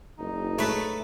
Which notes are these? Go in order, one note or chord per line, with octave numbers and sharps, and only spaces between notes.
F#1 D#4
A3 A4 B4 C#5